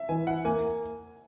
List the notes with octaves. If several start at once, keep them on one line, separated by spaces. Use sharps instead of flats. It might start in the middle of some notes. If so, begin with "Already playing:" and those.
Already playing: E5
E3 G#5
E4 F#5
A#3 G#5